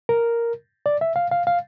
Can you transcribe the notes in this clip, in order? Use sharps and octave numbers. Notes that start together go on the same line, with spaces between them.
A#4
D5
E5
F5
F5
F5